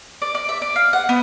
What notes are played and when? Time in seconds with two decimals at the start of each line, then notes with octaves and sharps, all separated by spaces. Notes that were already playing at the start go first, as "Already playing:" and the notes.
0.22 D5
0.35 D5
0.49 E5
0.62 D5
0.76 F5
0.93 F#5
1.09 B3